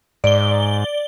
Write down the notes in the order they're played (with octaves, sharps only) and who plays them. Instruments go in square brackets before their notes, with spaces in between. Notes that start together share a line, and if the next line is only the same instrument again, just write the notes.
[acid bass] G#2 [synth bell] D5 G7